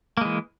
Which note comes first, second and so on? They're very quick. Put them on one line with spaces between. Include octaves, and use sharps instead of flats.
A#3 G#3 E3